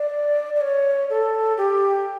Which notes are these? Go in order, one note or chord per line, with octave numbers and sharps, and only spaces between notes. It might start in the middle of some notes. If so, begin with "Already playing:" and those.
Already playing: D5
D5
C#5
A4
G4